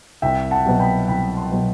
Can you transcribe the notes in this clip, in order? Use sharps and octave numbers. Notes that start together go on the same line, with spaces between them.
C2 E5 G5
F#5 A5
B2 F#3 B3
G5 B5
C2 G5 B5
A5 C6
B2 F#3 B3